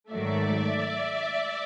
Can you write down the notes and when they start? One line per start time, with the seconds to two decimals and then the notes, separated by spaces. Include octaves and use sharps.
0.12 G#2 D#3 F#3 A3 D5 E5